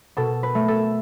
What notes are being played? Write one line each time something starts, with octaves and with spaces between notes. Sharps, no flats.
B2 A4
B4
A3
A4